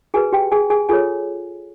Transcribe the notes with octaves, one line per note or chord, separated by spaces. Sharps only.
F#4 G#4 B4 G#5
G4 G5
G#4 G#5
G#4 G#5
F4 G#4 A4 C#5 G#5